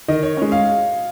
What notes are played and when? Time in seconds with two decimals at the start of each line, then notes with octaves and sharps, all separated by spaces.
0.08 D#3 D#5
0.23 C#5
0.37 G#3 C#4
0.52 F5